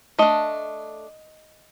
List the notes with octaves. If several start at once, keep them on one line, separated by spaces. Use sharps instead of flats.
A3 D4 D#5